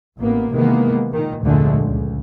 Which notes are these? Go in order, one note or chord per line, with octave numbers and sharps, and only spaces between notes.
A1 A#3 B3
C3 D#3 E3 G#3 A#3 B3
A#2 D#3
F1 D2 A#2 D3 G#3 A3
C#2